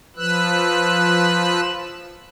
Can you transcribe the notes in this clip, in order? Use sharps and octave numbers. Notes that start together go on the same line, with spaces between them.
F3 B4 E6 F#6